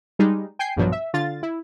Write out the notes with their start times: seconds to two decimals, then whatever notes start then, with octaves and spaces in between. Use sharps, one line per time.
0.19 G3 G#3 D#4
0.59 G5 G#5 G6 C7
0.76 A#1 G2 B2 F3 F#3
0.92 E5
1.14 D3 F4 A6
1.43 E4